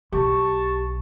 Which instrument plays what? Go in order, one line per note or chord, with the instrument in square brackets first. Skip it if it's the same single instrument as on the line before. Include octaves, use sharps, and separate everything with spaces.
[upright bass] B1 [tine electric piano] G4 [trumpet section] A5 C#6